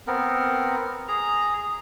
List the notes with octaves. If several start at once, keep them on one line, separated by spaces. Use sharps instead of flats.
B3 C4 A#4
G#4 A#5